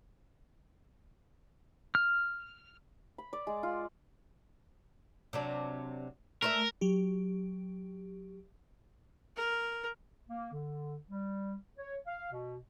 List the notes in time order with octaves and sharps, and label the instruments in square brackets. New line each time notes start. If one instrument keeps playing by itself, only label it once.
[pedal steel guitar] F6
[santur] B5
D5
G#3
F4
[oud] C3 F#3 D4
[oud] A3 C5 E5 [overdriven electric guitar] A#4
[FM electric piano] F#3 G4
[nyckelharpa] A#4
[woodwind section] A#3
D3
G3
C#5
F5
B2